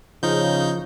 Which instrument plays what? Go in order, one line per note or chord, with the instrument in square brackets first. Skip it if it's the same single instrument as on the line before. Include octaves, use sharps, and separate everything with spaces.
[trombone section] C#3 [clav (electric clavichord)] F3 [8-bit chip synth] D#4 G6